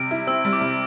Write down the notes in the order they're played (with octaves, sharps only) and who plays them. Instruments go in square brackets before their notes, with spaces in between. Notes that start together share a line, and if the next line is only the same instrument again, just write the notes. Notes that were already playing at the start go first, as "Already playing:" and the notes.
Already playing: [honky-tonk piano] C3 G3 [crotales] D7
[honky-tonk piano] E4
[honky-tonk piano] C4 [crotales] E6
[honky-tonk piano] G3
[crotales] D6
[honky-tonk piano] C3